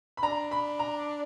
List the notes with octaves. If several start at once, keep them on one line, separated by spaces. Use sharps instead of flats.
B5
D4 A#5
B5
A#5